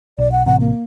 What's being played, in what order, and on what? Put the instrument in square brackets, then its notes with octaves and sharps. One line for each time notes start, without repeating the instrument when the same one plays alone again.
[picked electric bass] B1 [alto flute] D5
[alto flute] F#5
[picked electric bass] A1 C3 [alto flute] F#5
[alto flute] A#3